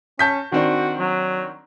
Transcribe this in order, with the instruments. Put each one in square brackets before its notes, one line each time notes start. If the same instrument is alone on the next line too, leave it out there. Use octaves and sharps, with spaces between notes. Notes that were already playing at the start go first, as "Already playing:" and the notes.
[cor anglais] C#4 [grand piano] A5 G6 B6
[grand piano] D#3 C4 D4 [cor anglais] F#4
[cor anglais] F#3